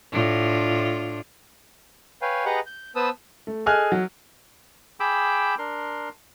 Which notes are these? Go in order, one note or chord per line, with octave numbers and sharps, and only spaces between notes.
A2 D4 F4
B4 C#5 F5 G5 G#5
G4 G#4 B4 D#5 F#5 A#5
G6
B3 B4 C5 A5 D#6 E6
A3
G#4 A4 D#5 G#5 F6 F#6
F#3
G#4 G5 B5 D6 E6
D4 A#4 C6